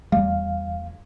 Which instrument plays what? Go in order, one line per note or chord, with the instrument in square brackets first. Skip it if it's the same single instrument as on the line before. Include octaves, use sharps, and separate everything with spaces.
[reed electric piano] E2 F5 [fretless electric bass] G3 A3